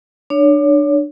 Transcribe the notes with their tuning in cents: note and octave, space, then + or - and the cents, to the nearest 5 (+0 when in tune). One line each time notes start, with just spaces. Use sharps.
D4 +25 C#5 +30